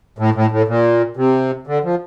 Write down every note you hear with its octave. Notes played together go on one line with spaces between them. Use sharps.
A2
A2
A2
A#2
C3
D3
F3